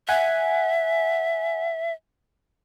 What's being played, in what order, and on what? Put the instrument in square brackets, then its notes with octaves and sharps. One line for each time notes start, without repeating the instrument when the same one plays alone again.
[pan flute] E5 [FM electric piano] F#5 G#5